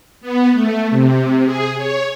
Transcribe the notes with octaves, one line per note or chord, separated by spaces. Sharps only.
B3
A3
C3
G#4
C#5